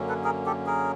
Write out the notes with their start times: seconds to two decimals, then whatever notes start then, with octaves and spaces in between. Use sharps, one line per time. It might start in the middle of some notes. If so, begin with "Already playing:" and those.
Already playing: F#2 D3 F#3 A#3 C#4
0.09 A4 B4
0.24 G#4 A#4
0.46 G4 A4
0.66 G#4 A#4